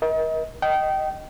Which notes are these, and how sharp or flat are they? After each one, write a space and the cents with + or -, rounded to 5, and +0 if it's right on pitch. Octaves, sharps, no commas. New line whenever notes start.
A#4 +40 D#5 +35
D#5 +0 G5 -25